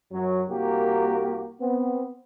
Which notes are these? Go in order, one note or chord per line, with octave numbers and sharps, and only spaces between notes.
F#2 F#3
C2 A#3 F#4 G4 A#4
B3 C4